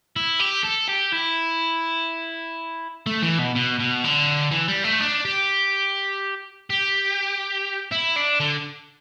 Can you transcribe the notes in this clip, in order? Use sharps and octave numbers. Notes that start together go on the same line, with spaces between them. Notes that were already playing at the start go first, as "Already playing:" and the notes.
E4
G4
A4
G4
E4
A3
E3
B2
B2
B2
D3
E3
G3
A3
D4
G4
G4
E4
D4
D3